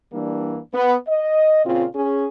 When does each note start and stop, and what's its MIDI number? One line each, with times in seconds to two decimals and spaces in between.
0.13 0.58 52
0.13 0.58 55
0.13 0.58 58
0.13 0.58 62
0.74 0.95 59
1.08 1.61 75
1.66 1.86 46
1.66 1.86 49
1.66 1.86 60
1.66 1.86 65
1.95 2.28 61
1.95 2.28 68